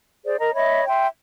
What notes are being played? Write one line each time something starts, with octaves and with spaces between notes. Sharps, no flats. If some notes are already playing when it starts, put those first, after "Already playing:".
G#4 C5 D5
A#4 D#5 A#5
C#5 D#5 E5 B5
E5 G5 C6